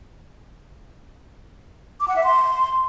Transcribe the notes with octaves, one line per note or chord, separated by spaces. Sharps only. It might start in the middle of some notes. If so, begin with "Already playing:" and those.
D6
F#5
E5
C6